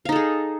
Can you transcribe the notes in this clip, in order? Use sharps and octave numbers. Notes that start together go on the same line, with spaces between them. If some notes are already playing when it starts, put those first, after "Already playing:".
D#4 G#4 A4 F5